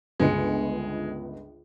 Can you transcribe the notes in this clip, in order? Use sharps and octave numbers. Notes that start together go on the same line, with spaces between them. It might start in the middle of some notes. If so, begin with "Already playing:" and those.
G1 C#2 G#3 C#7